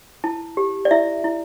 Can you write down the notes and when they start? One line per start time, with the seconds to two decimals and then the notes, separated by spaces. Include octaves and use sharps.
0.24 E4 A5
0.57 G4
0.85 D5
0.91 E4 E5
1.24 E4